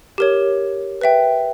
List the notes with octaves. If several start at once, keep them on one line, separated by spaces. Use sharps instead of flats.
G4 A#4 C#5
B4 E5 G5